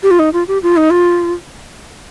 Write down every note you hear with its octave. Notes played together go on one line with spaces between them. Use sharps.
G4
F4
D#4
F4
G4
F4
D#4
F4